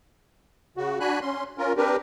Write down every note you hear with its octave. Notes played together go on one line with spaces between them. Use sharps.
C#3 F#4
D4 F#4 G#5 B5 F#6
C#4 C6
C#4 F4 A#4
C4 D4 G4 A#4 B4